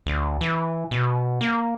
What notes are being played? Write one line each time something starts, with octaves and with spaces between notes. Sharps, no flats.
D2
E3
B2
A#3